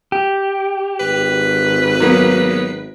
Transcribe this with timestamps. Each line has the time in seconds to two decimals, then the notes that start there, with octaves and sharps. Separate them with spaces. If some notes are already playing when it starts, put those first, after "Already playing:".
0.12 G4
1.00 G#1 B4
2.00 F#3 A#3 B3